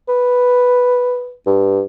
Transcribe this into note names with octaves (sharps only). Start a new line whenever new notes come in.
B4
G2